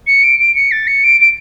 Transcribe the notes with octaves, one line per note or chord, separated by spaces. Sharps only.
C#7
D7
D7
C#7
A6
C#7
D7
D7